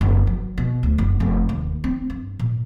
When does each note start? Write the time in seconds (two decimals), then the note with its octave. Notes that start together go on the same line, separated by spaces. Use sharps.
0.01 F#1
0.27 F#3
0.58 B2
0.83 D2
0.98 F#1
1.20 F1
1.49 D#2
1.84 C4
2.10 G2
2.39 A#2